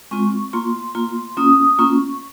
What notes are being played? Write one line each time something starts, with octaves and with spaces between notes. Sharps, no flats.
G#3 C4 F4 C#6
A#3 F4 C6
A#3 F4
A#3 C#4 F4 D#6
A#3 C#4 F4 C#6